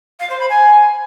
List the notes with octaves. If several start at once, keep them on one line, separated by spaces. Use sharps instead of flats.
F5
C5
B5
G#5